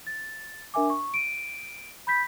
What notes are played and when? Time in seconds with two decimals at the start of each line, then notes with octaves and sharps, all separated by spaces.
0.07 A6
0.74 D4 A#4 E5 G#5 D6
0.90 C#6
1.14 D7 D#7
2.07 B5 G6 B6